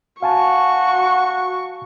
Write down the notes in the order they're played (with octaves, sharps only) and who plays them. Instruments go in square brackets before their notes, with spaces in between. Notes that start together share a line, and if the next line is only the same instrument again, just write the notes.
[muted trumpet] F#4 [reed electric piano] F5 G#5 A5 [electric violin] C#6